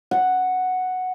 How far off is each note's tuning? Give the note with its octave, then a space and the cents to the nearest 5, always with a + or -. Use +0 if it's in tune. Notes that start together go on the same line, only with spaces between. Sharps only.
F#5 +0